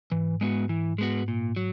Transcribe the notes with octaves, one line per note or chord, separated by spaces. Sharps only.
G#2 E3
G#3 B3 F#4
E3
G#3 B3 F#4
A#2
F#3